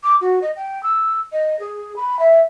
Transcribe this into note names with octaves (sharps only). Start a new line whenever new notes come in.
D6
F#4
D#5
G5
E6
D#5
G#4
B5
E5